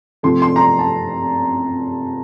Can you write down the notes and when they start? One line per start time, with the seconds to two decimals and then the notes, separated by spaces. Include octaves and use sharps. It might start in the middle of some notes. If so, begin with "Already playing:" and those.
0.23 C3 F3 A3 C6
0.42 C6
0.56 A#5
0.60 C6
0.79 A5